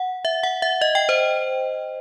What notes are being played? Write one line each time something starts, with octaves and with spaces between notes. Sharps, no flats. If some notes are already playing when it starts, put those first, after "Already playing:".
Already playing: F#5
E5
F#5
E5
D#5
G5
C5